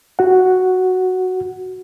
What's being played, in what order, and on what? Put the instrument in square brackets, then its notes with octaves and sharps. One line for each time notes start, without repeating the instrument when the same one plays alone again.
[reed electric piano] F#4 F#5